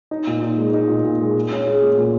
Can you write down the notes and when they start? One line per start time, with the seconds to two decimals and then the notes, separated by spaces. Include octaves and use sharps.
0.11 D#4
0.27 A#2
0.43 D#4
0.57 G#3
0.74 D#4
0.88 A#2
1.04 A#2
1.20 G#3
1.36 G#4
1.51 C#4
1.67 G#4
1.82 A#2
1.98 A#2